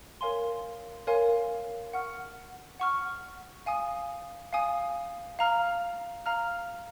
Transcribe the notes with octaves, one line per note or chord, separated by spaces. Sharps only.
A#4 C#5 F5 G#5 C6
A#4 C#5 F5 G#5 C6
F#5 C#6 F6
F#5 C#6 F6
F5 G#5 D#6
F5 G#5 D#6
F5 A#5 F6
F5 A#5 F6